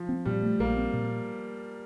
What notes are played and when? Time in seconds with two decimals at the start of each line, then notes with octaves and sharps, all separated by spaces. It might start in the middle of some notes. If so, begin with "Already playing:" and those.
Already playing: F3
0.09 C4
0.25 A#2 G3
0.43 A3
0.60 A#1 A#3
0.77 C4
0.93 A#2